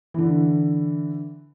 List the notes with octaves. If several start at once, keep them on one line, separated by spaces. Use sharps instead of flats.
D3 E3